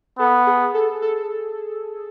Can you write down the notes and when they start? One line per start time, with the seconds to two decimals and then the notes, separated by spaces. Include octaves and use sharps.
0.19 B3 A4
0.47 G#4
0.74 A4
1.02 A4